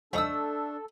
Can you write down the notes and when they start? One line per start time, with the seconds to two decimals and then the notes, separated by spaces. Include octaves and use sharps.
0.13 F3 A3 D4 D#4 A4 D#6 E6